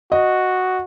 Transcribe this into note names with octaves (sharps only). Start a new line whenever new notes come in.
F#4 D#5